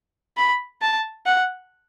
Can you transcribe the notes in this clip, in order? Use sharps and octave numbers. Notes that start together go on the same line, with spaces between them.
B5
A5
F#5